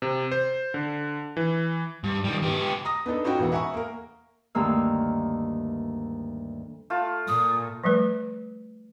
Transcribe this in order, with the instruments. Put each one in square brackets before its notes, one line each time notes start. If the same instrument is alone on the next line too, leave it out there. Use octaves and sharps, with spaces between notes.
[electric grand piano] C3
C5
D3
E3
[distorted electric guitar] G2
D#3 G3
B3 G4
[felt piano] A#5 D#6 A#6
B3 D4 D#4 A4
C#4 D#4 F4 F#4 C#5 G5
E1 B3 E4 F#5
E5 F#5 G#5 A#5 C#6
A#3 A#4
[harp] D2 G2 D#3 A#3 E6
[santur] A3 F4
[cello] A#2 [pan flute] D#6
[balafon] F3 G3 A3 B4